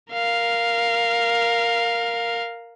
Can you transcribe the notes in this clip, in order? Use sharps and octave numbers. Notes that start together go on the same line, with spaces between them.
A#4 F5